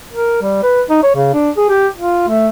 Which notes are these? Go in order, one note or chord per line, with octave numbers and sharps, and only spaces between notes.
A#4
G3
B4
D#4
C#5
C#3
D4
G#4
G4
F4
A3